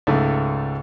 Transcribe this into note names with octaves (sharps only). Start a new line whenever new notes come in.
C#2 G#2 A3